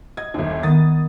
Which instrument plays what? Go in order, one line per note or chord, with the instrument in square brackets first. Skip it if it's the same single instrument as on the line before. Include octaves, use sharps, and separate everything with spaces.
[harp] D#5 [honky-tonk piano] G#6
[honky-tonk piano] G1 D#2
[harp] D#3 B3 [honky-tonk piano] D#6 A6